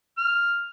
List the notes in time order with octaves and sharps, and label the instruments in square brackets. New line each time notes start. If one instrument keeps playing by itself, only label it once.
[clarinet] F6